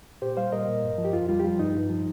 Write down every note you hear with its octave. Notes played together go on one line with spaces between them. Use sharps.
A#2 G4 C5
G3 C5 F5
A#2 A#4 D#5
A#2
G2
F3
G4
F2 F4
G3 F4
G4
F3 F4
G2 D#4
G2
F3